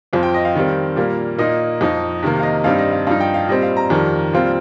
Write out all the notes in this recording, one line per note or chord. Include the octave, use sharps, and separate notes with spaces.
F2 F3 C4 F4
G5
D#5
F5
D#3 G3 C4
A#2 G3 A#3
A#2 A#3 D#4 D#5
F2 F3 D#4
C3 D#3 A#3
F5
D#5
G2 G3 C4 D#4 F5
D#5
F5
G2 F3 D#4 F5
G5
F5
A#2 G3 C4 D#5
F5
A#5
F2 D#3 G3
A#2 G3 C4 F4